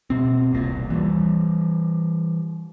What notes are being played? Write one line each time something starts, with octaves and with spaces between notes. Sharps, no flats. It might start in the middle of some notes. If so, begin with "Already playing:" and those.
B2 C4
E1 C2 A#2
E3 G3